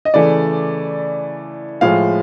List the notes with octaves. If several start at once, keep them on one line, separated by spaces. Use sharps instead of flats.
D#5
C#3 E3 A3 D5
A2 F3 G#3 F5